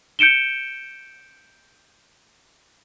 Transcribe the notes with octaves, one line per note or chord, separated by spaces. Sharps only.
G6 C#7 D7 E7 G7